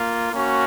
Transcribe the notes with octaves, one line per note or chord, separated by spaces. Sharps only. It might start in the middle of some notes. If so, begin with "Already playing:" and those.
Already playing: A#3 F4
A#3 C#4 F#4